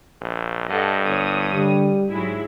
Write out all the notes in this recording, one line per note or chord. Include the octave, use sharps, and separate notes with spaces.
A#1
G2 A4 D#5 F#5
G1 C#5 D#6
D3 G3
G#2 F#3 G#3 E4